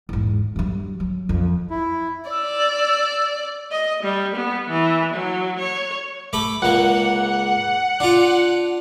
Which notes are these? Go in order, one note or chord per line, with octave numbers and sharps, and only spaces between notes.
E2 G#2
G2 F#3
F#3
F2
E4
D5 E6
D#5
G3
B3
E3
F#3
C#5
A3 B5 D6
C#2 A#3 F#5
D4 F4